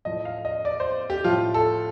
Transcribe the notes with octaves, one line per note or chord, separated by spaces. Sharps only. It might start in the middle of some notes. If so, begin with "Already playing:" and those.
A2 F3 D#5
F5
D#5
D5
C5
G4
A2 F3 F4
A4